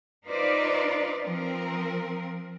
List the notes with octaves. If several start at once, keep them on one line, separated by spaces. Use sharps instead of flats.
D#4 F4 B4 C5 D5
F3 C4 A#4